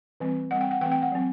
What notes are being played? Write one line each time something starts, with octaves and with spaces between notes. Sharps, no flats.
E3 G3 C4
G3 C4 F#5
G5
F#5
E3 A3 C4 G5
G5
F#5
F#3 C4